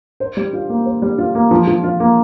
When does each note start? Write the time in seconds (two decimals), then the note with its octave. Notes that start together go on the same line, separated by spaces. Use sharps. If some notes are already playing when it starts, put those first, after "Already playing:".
0.20 C5
0.37 G3
0.53 F4
0.70 A#3
0.86 C5
1.02 G3
1.18 F4
1.35 A#3
1.51 F3
1.67 F3
1.83 F4
2.00 A#3